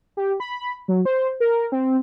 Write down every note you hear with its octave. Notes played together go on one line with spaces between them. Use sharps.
G4
B5
F#3
C5
A#4
C4